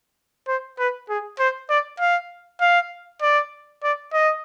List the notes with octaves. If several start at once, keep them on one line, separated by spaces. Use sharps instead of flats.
C5
B4
G#4
C5
D5
F5
F5
D5
D5
D#5